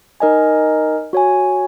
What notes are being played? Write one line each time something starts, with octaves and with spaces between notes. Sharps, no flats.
D#4 A#4 D#5 G#5
F#4 C#5 G#5